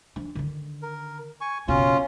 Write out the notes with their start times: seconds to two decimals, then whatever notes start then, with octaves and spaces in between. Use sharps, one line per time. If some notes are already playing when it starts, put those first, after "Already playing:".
0.16 F3 D4
0.35 D3 D#3
0.82 A#4
1.41 G#5 C#6
1.68 F#1 B2 C#4 F4